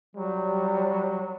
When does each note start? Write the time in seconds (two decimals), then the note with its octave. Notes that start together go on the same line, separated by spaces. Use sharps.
0.16 F#3 G3